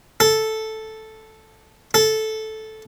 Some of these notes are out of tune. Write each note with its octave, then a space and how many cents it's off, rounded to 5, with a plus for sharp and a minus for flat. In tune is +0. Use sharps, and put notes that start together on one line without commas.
A4 -5
A4 -10